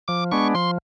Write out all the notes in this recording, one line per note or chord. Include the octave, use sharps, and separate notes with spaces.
F3 D6
G#3 B3 D4 C#6
F3 C6